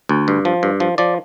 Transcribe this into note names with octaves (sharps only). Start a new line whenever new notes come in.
D2
G2
F3
G2
F3
F3 D5